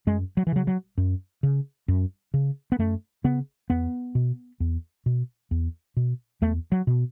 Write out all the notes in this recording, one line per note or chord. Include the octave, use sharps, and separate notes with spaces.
F#2 G#3
F#3
E3
C#3 F#3
F#3
F#2
C#3
F#2
C#3
B3
F#2 A3
C#3 B3
E2 B3
B2
E2
B2
E2
B2
E2 A3
F#3
B2